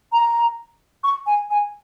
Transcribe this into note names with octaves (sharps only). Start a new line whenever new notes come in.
A#5
C#6
G#5
G#5